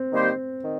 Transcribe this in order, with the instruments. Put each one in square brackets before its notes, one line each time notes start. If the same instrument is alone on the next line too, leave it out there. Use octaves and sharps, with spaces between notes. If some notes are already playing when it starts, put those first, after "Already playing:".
Already playing: [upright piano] C4
[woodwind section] D#3 G3 A#3 G4 C5
D#3